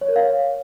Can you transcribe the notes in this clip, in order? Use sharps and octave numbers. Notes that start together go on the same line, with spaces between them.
C#5
A#4
F5
C#5